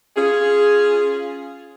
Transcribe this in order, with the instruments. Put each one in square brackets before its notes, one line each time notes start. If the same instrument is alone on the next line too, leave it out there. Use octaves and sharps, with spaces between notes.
[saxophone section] C#4 F4 G#4